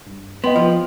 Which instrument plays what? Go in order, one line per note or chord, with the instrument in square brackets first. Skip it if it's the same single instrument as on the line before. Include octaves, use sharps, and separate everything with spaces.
[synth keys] G2
[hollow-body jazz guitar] B3 [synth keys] D#5 G5 C6
[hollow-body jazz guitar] F3